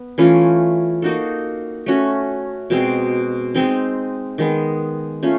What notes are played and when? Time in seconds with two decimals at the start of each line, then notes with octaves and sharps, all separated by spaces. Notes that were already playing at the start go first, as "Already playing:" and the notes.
Already playing: B3
0.18 E3 A3 C#4 F4
1.02 A#3 D#4 F#4 A4
1.86 A3 C#4 F#4
2.70 B2 G#3 C4
3.54 G#3 C4 D#4
4.38 D#3 G#3 B3
5.23 A3 C#4 F4